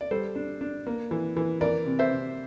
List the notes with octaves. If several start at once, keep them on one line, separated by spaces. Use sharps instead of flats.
D5
G3 A4 C5
D4
D4
A#3
E3
E3
E3 A#4 D5
C3
C5 E5
C3